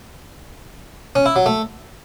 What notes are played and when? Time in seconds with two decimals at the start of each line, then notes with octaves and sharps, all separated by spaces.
1.16 C#4
1.26 E4
1.36 F#3
1.46 A3